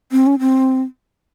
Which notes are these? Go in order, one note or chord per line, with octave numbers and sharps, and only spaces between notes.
C4
C#4
C4